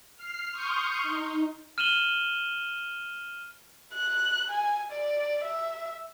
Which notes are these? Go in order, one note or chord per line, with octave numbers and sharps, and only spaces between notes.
F6 C7
C6 C#6 D#6 F6 G6
D#4
F6 D#7 E7 F#7 G7
F#6
G#5
D5
E5